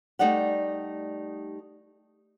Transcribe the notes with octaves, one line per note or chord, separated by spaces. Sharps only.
G3 A3 D#4 G4 D5 F#5